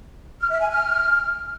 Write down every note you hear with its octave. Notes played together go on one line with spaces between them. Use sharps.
F6
E5
G#5
F6